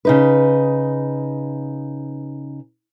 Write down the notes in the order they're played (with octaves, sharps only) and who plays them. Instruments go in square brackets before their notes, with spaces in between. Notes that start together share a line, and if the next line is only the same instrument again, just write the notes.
[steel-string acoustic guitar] C#3 D#4 B4